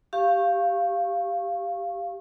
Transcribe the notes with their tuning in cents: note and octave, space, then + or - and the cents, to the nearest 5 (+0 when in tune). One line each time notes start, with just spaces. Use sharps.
G4 +0 F5 -10 C#6 -15